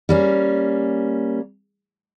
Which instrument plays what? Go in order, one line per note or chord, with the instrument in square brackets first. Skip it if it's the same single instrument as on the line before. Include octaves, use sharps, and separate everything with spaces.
[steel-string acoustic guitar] G3 A#3 C#4